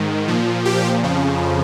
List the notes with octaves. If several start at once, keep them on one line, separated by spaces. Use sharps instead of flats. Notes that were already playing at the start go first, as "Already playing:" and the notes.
Already playing: G#2 D#3
A#2 F3
G4
F2 C#3 F3